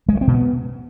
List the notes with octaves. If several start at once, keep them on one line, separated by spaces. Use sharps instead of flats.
G#3
A3
C4
B2
B3